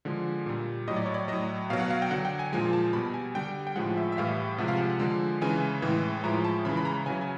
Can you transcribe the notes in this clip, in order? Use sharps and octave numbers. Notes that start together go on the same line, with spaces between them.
D3 F3 G#3
A#2 G3
A2 F#3 D#5
D5
C#5
D5
A2 F#3 D#5
B2 F#3 F5
F#5
F5
G5
D3 F#3 F#5
G5
G#5
A#2 F3 G#3 G#5
A5
B2 G3 B5
G#5
D3 G3 G5
G5
A2 F3 G#3 F#5
E5
E5
A2 E3 G3 F5
C3 F3 G#3 F#5
F5
F#5
D3 F3 G#3
C#3 E3 G#3 G#5
A2 E3 G#3
A2 F3 G#3 A#5
A5
C#3 E3 G#3 B5
B5
A#5
C#3 F#3 G#5
G#5